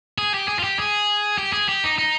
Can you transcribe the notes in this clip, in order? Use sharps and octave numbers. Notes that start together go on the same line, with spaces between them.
G#4
G4
G#4
F4
G4
G#4
G4
G#4
G4
D#4
D#4